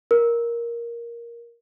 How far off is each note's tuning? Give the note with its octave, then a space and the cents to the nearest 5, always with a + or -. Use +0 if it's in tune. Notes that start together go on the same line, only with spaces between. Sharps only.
A#4 +10